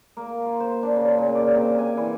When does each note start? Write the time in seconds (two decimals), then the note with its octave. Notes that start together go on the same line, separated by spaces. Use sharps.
0.17 A#3
0.45 F4
0.60 C5
0.83 D4
0.96 C#3
1.18 A#2
1.35 D5
1.55 C3
1.79 G#5
1.97 E3